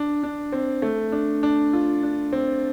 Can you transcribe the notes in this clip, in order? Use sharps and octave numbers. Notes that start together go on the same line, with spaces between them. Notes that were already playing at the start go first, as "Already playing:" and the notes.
Already playing: D4
D4
C4
A3
D4
D4
F4
D4
C4